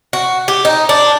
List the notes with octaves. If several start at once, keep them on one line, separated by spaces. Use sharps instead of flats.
F#4
G4
D#4
D4